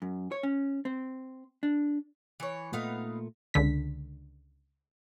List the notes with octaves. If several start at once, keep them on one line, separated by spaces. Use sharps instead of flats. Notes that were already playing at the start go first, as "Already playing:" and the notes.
F#2
C#5
C#4
C4
D4
E3 C#5
A#2 A3 B3 D#4 F5
C#2 D3 B6